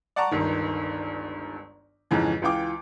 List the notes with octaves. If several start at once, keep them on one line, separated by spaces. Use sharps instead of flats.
D5 F#5 A5 A#5 C#6
G1 C#2 G2 D#3
F2 G#2 C#3 E3
C#2 E3 F4 G5 D6